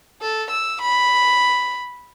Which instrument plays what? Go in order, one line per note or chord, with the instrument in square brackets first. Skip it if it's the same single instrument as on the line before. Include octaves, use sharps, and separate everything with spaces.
[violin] A4
E6
B5